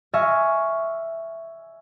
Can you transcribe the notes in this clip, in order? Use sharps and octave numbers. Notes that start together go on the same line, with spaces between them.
E5 G#5 C#6 F6 A#6